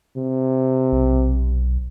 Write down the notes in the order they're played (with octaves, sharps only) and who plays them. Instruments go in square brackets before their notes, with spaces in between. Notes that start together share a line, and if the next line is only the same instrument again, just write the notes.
[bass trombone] C3
[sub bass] B1